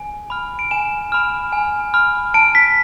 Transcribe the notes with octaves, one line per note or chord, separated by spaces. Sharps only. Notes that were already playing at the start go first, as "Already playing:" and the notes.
Already playing: G#5
B5 F6
D7
G#5 E7
B5 F6
G#5
B5 F6
A5 D7
B6